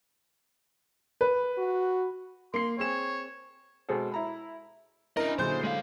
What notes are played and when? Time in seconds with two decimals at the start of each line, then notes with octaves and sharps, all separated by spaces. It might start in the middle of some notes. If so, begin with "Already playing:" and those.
1.21 B4
1.58 F#4
2.54 A#3 C6 C7
2.78 C4 G#4 C#5 E7
3.89 B2 G#3 C4 G#4 A4
4.12 E4 A#5 B5
5.17 C#4 D4 E4 A#4 D#5
5.38 A#2 D3 F#3 G#4 C5 C6 G6
5.64 G#3 F5